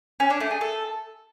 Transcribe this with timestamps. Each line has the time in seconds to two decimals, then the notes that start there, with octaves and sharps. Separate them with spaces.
0.20 C#4
0.30 D4
0.40 A3
0.51 G#4
0.61 A4